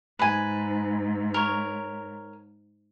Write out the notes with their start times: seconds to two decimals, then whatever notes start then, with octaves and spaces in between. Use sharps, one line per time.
0.19 G#2 B4 G#5
1.34 A#4 C#5